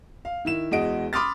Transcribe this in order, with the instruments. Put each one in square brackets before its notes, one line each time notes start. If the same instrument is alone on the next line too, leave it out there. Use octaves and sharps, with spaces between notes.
[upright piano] F5
D#3 E4 E7
E2 G#3 F#4 D#5 D7
B5 C6 D6 D#6 F6 A6